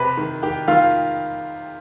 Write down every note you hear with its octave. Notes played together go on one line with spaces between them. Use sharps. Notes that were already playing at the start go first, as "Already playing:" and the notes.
Already playing: C3 B4 B5
D#3
D#3 G4 G5
D#3 F4 F5